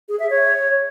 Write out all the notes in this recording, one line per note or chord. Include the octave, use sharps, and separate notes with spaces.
G#4
E5
C#5